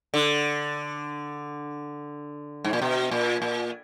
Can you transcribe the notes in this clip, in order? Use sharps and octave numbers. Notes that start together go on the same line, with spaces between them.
D3
G#2
A#2
B2
A#2
A#2